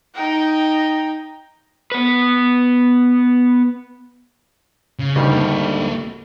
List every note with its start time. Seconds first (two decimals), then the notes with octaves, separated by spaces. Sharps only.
0.15 D#4 G5
1.92 B3 B4
4.99 C#3
5.16 D2 D#3 G3
5.31 A#3 A4